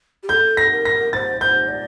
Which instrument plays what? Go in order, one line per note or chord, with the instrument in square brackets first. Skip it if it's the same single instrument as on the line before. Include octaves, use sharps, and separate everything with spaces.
[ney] G4
[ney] A4 [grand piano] G6
[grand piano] A#6
[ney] A#4
[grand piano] A#6
[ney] C5 [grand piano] A6
[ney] C5 [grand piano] G6
[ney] D5